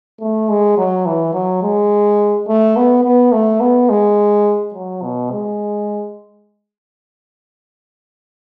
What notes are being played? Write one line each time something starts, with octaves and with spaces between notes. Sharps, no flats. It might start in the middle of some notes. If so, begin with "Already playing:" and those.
A3
G#3
F#3
E3
F#3
G#3
A3
B3
B3
A3
B3
G#3
F#3
B2
G#3